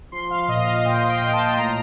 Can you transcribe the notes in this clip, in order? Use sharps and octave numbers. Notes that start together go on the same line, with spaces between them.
F3 C6
F5
A#2 D#5
F5
A#2 G5
G5
A#2
A5
C6
A2 A#5